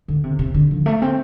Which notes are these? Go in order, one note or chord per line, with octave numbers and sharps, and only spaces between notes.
D3
C3
C3
D3
F3
A3
C4